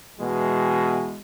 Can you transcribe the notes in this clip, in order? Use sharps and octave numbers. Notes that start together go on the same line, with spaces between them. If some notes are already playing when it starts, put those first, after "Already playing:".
B2 E3 G#3